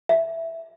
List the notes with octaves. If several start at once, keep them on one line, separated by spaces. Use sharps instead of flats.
E5